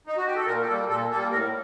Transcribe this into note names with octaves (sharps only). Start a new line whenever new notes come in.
D#4
F#4
G4
A4
A#2 A#4
G4
G3 A#3 A4
A#2 A4
G3 A#3 A4
A2 A#4